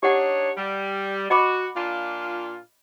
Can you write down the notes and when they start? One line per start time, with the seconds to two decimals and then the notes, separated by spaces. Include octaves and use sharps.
0.03 D4 D#4 G4 C#5 F#5
0.56 G3
1.30 F#4 D#5 B5 D6
1.76 A#2 D4 F4